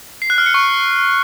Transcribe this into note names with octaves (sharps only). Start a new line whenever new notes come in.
C7
F#6
F6
C#7
C#6